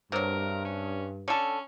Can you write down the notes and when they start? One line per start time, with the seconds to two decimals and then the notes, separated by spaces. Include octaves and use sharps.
0.12 G2 C3 F#3 A#4
0.65 C#4
1.28 D3 C#4 A4